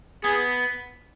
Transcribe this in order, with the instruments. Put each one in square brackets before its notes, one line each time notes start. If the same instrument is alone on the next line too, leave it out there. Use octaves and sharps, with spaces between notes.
[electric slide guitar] B3 [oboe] G#4